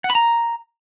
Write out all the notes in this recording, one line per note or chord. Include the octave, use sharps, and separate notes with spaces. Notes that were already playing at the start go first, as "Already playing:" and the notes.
F#5
B5
A#5